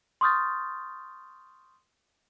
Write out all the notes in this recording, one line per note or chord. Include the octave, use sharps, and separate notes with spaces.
C6 C#6 D#6 F6 G6 A6